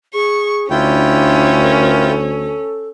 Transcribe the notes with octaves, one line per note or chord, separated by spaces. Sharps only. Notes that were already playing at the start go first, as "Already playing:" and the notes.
G#4 C#6
D2 C#4 D4 E4 F4 G5
A#4
A4